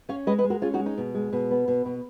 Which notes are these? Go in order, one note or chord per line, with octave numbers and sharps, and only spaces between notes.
C#4 C#5 F5
G#3 B4 D#5
B4 D#5
G#3
F#4 A#4
C#4 F4 G#4
D#4 F#4
G#3
D#4
B2
G#3
B2
B3
B2
B2